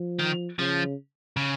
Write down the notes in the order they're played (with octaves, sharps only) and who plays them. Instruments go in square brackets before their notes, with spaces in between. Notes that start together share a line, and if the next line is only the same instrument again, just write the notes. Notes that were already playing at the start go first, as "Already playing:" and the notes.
Already playing: [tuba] F3
[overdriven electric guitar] D#3
[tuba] C#3 [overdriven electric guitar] F3
[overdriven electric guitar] C#3